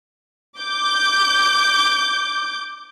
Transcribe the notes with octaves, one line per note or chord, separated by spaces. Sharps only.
D6 G6